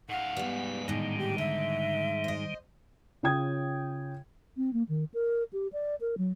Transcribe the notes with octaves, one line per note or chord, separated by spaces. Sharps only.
G#2 F5 F#5
G3 B3 B4
A2 D3 D#3 G3 D#4
G4
D3 E5
C5 D#5
C#3 F4 C#5 G5 D#6 G#6
C4
A#3
D#3
A#4
G4
D5
A#4
F#3